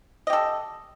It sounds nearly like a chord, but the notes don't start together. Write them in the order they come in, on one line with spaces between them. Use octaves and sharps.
D#5 G4 A4